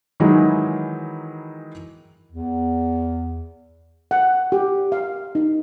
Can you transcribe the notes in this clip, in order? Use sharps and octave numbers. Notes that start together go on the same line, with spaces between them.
D#3 E3 F#3 G#3 D#4 E4
E2
F#5
G4
F5
D#4